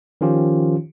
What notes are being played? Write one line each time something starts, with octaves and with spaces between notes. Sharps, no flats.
D#3 F3 C#4 F4 G4